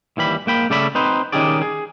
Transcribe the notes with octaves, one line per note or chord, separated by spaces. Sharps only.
D#2 E3 G3 B5
G#2 A#3 G5 B5
C#3 G3 A3 D5 E5 B5
C4 D#4 B4 C5
D#3 C#4 D#4 G4 G#4 D5
G#4